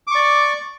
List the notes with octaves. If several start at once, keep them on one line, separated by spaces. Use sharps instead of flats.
D5 C#6 D6